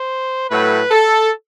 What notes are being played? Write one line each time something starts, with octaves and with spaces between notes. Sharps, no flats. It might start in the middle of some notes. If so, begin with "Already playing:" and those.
Already playing: C5
A2 F#3 A3 B4
A4